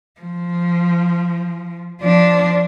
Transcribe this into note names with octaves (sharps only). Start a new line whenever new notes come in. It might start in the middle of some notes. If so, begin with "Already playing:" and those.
F3
F3 D4